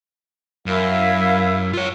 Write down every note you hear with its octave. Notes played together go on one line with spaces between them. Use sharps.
F#2 E4 A#4 F5
F4 C#5